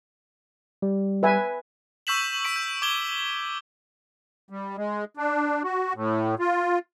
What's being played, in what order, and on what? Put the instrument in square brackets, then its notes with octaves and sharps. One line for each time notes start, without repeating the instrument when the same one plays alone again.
[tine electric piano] G3
[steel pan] B4 E5 G#5
[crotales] C#6 E6 G6 B6 E7 F#7
C#6 B6 D7
G6
D6 G#6 G7
[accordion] G3
G#3
D4
F#4
A2
F4